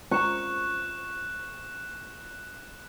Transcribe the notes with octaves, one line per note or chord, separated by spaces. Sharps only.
C#6 F#6 E7